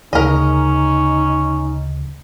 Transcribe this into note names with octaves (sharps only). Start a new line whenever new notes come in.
D2 C#3 C#4 D#4 A#4 D#5